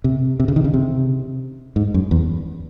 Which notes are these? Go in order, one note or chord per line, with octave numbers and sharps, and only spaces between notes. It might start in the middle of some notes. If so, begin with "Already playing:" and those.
C3
C3
C#3
D#3
C#3
C3
G#2
F#2
E2